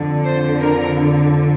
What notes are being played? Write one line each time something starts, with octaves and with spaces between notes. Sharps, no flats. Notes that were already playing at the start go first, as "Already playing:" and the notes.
Already playing: F2 D3
C5
A#4